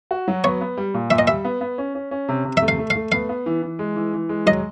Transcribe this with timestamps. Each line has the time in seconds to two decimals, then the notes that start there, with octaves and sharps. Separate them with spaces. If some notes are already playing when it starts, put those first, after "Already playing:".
0.11 F#4
0.28 F#3
0.44 B3 C#5
0.61 B3
0.77 G3
0.94 A#2
1.11 A#2 E5
1.19 D#5
1.28 G3 E5
1.45 B3
1.61 B3
1.78 C#4
1.95 C#4
2.11 C#4
2.29 C3
2.45 C3
2.57 E5
2.62 A3
2.68 F5
2.78 A3
2.90 F5
2.95 A3
3.12 B3 F5
3.29 B3
3.46 E3
3.62 E3
3.79 G#3
3.96 E3
4.13 E3
4.29 G#3
4.46 F#3 D#5